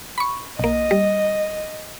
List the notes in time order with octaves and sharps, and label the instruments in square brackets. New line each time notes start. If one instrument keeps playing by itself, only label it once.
[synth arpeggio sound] B5 C#6
[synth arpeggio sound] B1 A#3 [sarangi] D#5
[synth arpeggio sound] G3